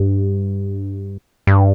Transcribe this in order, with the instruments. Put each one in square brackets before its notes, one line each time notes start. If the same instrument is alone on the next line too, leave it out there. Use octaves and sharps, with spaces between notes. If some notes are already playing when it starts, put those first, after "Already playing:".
Already playing: [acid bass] G2
G2